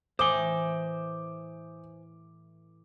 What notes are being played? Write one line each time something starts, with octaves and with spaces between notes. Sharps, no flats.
A2 E3 C5 G#5 D6 D#6 G7